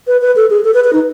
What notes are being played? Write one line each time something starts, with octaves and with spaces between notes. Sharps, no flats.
B4
B4
A4
G#4
A4
B4
B4
D#4